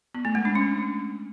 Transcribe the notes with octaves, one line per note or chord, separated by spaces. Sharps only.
B3
A3
G#3
D4
C#4